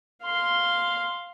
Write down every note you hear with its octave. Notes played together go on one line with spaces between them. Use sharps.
F5 C6